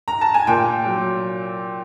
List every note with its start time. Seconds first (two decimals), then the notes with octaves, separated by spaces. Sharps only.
0.08 A#5
0.21 A5
0.34 G#5
0.47 A#2 G5
0.86 F#3